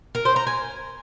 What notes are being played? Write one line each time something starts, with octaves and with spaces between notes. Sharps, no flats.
A#4
C5
A#5
G#5